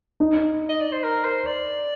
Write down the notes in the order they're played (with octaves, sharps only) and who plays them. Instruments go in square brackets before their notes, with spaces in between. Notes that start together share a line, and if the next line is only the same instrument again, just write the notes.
[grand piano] D#4
[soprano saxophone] D#5
D5
C5
A#4
C5
D5